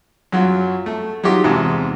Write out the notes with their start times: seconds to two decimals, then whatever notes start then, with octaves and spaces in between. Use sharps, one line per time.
0.32 F#2 F#3 F4
0.86 A3
1.24 F#3 D#4 F4 G4
1.44 E2 G#2 C3 A5